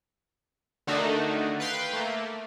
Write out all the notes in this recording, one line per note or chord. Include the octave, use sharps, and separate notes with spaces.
D3 D#3 A3 D4 D#4 F#4
B4 F5 G5 C6
A3 A#3